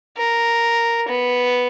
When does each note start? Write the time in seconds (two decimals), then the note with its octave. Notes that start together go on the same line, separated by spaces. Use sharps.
0.17 A#4
1.09 B3